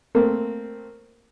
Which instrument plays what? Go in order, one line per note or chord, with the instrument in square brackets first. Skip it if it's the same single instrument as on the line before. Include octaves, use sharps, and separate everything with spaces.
[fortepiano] A3 A#3 C4